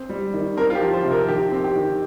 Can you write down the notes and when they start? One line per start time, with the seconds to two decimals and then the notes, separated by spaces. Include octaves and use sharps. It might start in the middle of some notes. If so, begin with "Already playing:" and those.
Already playing: C4
0.09 G3
0.34 D#3
0.57 C4 A#4
0.70 F4
0.75 G4
0.81 F3
0.93 C5
1.05 C3
1.11 A#4
1.28 D#3 G4
1.52 C4
1.64 G4
1.76 D#3